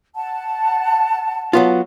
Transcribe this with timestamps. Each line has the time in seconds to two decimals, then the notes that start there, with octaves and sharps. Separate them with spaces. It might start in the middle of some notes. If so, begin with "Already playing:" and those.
0.15 F#5 A5
1.53 F#3 B3 F4